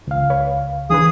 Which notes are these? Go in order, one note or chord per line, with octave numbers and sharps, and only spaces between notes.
C#2 F5
B4 C#5
E3 D4 G#4 B4 D#6